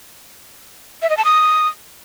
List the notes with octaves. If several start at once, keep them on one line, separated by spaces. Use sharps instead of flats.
E5
D#5
A5
D#6